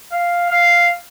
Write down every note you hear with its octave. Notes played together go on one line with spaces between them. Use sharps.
F5
F5